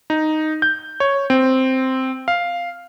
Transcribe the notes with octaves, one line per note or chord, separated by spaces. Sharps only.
D#4
G6
C#5
C4
F5